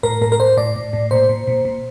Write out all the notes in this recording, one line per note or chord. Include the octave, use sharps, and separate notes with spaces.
A2 A#4
A2 A#4
A#4
A2 C5
A2 D5
A2
A2
A#2 C5
A#2
A#2
A#2